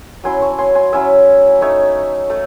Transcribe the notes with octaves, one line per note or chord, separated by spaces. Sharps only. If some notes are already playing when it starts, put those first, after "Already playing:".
F#3 C#4 E4 G#5 C6
A5 C#6
G#5 C6
G#5 C6
F#3 C#4 E4 E5 G#5
A3 D#4 C#5 E5
A3